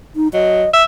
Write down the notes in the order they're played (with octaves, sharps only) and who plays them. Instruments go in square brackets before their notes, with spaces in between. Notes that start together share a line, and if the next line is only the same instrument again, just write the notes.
[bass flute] D#4
[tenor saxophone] F#3 [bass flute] D#5
[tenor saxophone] E5